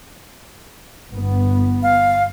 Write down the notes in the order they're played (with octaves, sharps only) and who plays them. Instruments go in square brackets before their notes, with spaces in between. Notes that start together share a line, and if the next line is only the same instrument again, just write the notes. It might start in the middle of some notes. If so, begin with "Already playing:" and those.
[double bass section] G1 B3
[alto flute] F5